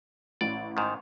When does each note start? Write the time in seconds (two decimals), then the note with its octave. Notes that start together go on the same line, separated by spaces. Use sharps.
0.41 A1 D5
0.77 G#2 D#3